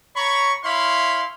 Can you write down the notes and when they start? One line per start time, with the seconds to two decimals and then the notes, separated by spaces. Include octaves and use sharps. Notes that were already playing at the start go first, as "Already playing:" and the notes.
0.16 C#5 A#5 B5 C#6
0.64 E4 C#5 F5 B5 C6